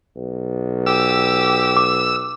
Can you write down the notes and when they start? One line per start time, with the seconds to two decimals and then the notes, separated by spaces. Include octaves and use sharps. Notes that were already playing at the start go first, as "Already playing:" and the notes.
0.16 B1
0.86 G4 E6
1.77 D6